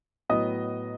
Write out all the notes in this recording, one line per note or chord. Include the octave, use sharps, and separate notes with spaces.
A2 F#3 B3 D#5 D#6